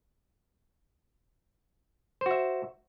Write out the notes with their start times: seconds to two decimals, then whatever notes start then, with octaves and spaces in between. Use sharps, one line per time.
2.21 C5
2.26 F#4
2.31 E5